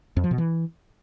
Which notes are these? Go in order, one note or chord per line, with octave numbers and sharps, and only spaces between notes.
F2
F3
B2
E3